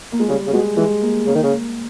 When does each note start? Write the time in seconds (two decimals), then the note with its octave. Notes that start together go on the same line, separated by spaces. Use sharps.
0.12 A#3
0.20 G#3
0.28 C#3 G3
0.47 C#3
0.53 B2 G#3
0.77 E3 G#3
1.02 A#3
1.26 C#3 A#3
1.35 D#3
1.43 C#3